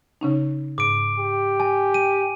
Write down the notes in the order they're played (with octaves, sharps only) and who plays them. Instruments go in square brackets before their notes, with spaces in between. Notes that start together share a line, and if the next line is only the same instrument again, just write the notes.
[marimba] C#3 C#4 D#4
[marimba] G#2 [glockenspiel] D6 D7
[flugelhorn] G4
[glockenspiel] G#5
D#7